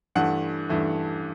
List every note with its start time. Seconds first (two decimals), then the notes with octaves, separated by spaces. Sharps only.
0.15 G2 E3 A3 F#5
0.69 G2 E3 A3